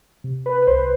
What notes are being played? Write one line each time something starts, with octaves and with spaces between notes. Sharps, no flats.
C3
B4
B4
C2 C5